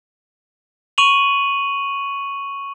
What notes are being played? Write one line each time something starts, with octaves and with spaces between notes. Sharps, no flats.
C#6 D#7 F7 F#7